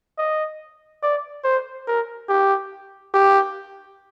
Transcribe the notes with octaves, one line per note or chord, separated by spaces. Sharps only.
D#5
D5
C5
A#4
G4
G4